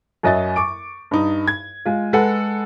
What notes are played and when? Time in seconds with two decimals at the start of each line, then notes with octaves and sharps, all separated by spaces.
0.23 F#2 F#3 D#5 E5 A6
0.56 C#6 D6 D7
1.11 G2 D#4
1.48 G#6
1.85 G#3 F4
2.13 G#3 A4 B4 F#5